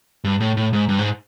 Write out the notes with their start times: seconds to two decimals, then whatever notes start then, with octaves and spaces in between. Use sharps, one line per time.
0.24 G2
0.40 A2
0.57 A2
0.73 G#2
0.89 G2
0.99 G#2